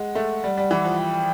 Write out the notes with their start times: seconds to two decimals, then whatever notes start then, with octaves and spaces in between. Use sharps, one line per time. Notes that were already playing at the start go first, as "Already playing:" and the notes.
Already playing: G#3 F#5
0.15 A3
0.44 G3
0.57 G3
0.71 E3
0.85 F3
0.99 G5